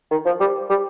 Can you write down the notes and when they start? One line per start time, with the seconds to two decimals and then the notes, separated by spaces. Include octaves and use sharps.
0.11 D#3
0.25 F3
0.40 G3
0.69 G3